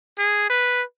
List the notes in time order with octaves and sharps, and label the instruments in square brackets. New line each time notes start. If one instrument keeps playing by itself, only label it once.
[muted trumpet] G#4
B4